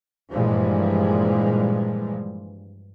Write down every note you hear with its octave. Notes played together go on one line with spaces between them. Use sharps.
G2 A#2 E3 F3 G3 G#3